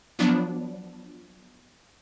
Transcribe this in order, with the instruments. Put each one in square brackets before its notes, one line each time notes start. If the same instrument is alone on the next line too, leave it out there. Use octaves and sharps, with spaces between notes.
[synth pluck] F3 F#3 B3 D4